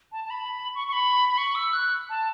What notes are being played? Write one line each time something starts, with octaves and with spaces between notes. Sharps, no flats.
A5
A5
B5
C#6
C#6
B5
B5
C#6
E6
F#6
A5